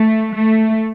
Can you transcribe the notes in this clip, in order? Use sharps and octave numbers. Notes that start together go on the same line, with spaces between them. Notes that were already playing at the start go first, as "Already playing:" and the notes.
Already playing: A3
A3